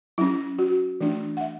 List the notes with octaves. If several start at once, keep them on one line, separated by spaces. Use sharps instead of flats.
F#3 C#4 E4
F#4
E3 A3 D4
F#5
E5